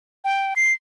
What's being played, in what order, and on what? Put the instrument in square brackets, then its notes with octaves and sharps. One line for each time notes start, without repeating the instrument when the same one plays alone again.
[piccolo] G5
C7